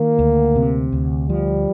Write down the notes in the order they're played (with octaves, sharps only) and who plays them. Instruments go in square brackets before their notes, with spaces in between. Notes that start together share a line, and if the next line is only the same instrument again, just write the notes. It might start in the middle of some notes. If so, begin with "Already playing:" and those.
Already playing: [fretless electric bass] D#3 [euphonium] A#3
[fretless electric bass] D2
C3
D2
[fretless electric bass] F3 [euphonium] G3